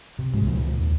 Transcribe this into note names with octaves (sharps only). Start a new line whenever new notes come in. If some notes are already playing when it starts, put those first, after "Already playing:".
C3
C2 G#2 G#3
C#2 A#2 D#3 F3
D#2